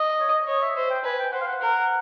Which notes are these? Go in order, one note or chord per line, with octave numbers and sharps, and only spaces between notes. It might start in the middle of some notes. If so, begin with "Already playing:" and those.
Already playing: D#5
C#5
D#5
C#5 D#5
E5
C5 E5
G5
B4 G#5
G5
C5 F#5
F5
F#5
A#4